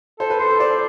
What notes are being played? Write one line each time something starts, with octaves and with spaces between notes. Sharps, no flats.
A4 C5
B4
A4 C5
A4
C5 D5